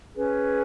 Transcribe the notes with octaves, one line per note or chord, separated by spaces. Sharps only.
C#4 G#4 B4